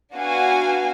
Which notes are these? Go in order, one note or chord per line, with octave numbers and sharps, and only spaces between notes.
B3 D4 F#4 F5 G#5